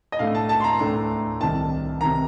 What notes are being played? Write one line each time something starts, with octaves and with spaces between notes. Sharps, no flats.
D#5
A2 A3 D4 F5
A5
A5
C6
A#5
A2 A3 D4
C2 C3 D#3 A5
C3 D#3 A#5